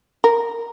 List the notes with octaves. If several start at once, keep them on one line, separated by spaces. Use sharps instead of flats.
A#4